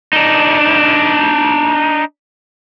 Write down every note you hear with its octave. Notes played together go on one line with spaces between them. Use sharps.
D4 D#4